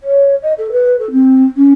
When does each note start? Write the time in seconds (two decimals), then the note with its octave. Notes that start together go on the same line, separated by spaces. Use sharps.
0.01 C#5
0.42 D#5
0.58 A4
0.71 B4
0.99 A4
1.11 C4
1.56 C#4